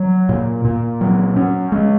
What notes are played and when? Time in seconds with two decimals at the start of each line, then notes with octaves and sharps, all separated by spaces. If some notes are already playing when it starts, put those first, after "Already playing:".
Already playing: F#3
0.29 A#2
0.65 A#2
1.01 F#3
1.36 C#4
1.72 G#3